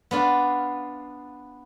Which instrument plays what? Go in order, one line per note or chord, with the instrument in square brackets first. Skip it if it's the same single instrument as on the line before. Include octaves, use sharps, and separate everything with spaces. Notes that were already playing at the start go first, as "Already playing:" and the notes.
[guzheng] B3 D4 F4